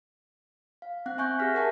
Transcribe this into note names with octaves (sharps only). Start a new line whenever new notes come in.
F5
C4 F#5 F#6
E5 G#5 C#6 F#6 G6
G4 G#4 F6 A#6 B6
G4 A#4 E5 F#5 G#5 A5